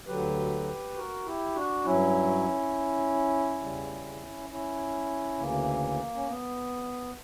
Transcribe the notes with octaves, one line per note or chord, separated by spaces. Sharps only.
D2 D3 F#3 G4 B4
F#4 A#4
E4 G4
D4 F#4
G2 F#3 C#4 E4
E2 C#3 G3
C#4 E4
D2 C#3 E3 A#3
C#4
B3